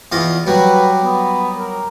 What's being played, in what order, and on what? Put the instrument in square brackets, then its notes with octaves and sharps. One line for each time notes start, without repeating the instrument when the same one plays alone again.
[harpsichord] E2 F4 D#5
[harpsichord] F#3 G3 [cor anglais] B4
[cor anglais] B3
A#4